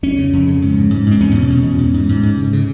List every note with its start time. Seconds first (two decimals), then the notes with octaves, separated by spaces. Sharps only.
0.03 F2 C#4
0.18 C#3
0.33 F2
0.47 C#3
0.62 G#2
0.76 G#2
0.90 G#2
1.06 G#2
1.11 C4
1.20 E2 C#4
1.35 B2
1.50 B2
1.64 E2
1.78 G#2
1.94 G#2
2.09 G#2
2.23 G#2
2.37 C#3
2.53 C#3